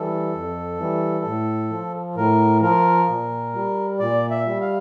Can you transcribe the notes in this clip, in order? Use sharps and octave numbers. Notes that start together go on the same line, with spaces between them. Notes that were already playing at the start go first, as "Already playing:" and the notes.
Already playing: E3 G3 A4
F2
E3 G3
A2
F3
A2 A#4
F3 A#4
A#2
G3
A#2 D5
E5
G3
F5